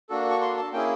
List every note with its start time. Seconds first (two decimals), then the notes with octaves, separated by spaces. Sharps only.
0.09 A#3 D4 F#4 A4
0.30 C#6
0.41 C6
0.57 A5
0.72 A#3 C#4 E4 G#4 G5